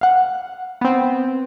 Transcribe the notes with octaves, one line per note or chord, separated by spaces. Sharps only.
F5 F#5
B3 C4